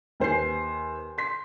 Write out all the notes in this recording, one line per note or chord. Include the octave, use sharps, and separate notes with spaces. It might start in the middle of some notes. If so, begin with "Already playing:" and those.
D#2 B4 C5 G#5 C6 C7
C6 B6